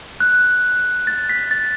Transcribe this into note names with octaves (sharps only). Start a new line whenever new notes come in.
F#6
A6
B6
A6